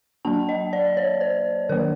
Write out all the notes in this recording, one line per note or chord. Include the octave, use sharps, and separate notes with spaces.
F#3 A#3 D4 A5
D#5
D5
C#5
C5
D#3 F#3 A#3 A#4